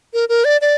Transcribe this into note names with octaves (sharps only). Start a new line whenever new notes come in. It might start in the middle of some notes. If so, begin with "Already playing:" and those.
A#4
A#4
D5
D5